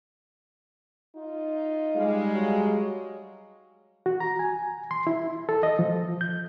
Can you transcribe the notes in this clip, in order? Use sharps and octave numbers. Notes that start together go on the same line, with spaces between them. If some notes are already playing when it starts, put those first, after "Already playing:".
D#4 F4
G3 G#3 F5
F#3
F#4
A#5
G#5
C6
E4
A4
D#5
F3
G6